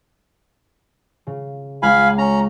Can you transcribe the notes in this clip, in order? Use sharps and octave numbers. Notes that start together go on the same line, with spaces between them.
C#3
C#2 F5 G#5 B5
C#4 A#5